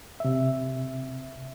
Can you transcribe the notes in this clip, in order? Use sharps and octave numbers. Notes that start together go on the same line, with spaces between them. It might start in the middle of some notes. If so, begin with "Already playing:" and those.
C3 E5